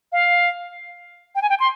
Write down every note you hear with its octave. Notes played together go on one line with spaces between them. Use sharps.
F5
G5
G#5
G5
C6